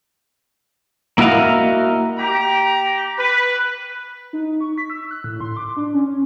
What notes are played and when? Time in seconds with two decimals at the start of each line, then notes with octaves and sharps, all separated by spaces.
1.18 A#3 E4 F#4 D#5 F5
2.19 G4 A#5
3.19 B4
4.33 D#4
4.61 C#6
4.78 B6
4.90 E6
5.11 F#6
5.24 A2
5.41 C6
5.57 D6
5.77 D4
5.94 C#4
6.08 C#4